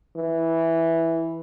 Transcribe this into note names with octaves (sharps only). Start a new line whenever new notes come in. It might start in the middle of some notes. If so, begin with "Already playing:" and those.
E3